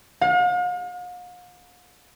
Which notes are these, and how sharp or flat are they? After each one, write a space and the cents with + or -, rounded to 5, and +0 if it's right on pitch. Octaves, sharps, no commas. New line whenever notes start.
F5 +45